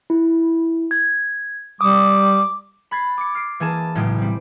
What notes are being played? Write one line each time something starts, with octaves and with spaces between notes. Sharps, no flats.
E4
G#6
G3 D6 D#6
B5 F#6 G#6 A6 B6 C7
D6 C#7
F6 C7 D7
E3 A#3 G#4 A5 E7
B1 A2 C#3 G#3 G5 D7
G3 C4